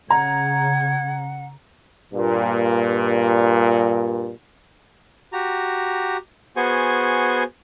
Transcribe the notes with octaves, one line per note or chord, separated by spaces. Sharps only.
C#3 F#5 G#5 A#5
G2 A#2
F#4 G4 A#5
B3 F#4 G#4 C5 G#5 C#6